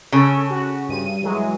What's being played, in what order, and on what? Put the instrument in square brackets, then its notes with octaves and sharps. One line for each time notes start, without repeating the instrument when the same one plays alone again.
[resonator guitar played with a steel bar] C#3 [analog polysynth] C#4 A4
[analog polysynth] F#4
G2 D#7
E3 F#3 G#3